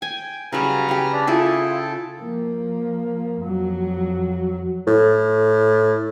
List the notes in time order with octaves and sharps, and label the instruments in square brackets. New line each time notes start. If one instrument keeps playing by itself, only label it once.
[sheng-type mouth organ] G5 [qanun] G#5
[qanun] C#3 F#3 G3 [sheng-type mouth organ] B4 A#5 F6
[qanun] C#3 G4
[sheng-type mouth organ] D4 D5
[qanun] E4 G#4 [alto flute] F4 [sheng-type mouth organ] A4 G5 A5
[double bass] F3 A#3
F2 F#3
[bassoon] A2